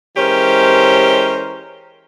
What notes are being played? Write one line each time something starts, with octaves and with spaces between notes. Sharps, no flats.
E3 G#3 C#4 G4 A#4 C5